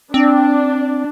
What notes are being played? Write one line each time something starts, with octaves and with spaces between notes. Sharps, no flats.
C4 D4